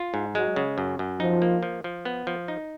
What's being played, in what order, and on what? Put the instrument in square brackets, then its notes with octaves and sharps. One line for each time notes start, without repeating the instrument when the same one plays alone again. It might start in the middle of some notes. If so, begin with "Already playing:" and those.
Already playing: [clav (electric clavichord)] F4
G#2
[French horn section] F#3 [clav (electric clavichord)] G#3
[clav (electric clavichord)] C#3
F#2
F#2
[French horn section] F3 [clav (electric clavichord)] D#4
[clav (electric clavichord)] A#3
F3
F3
B3
F3
D#4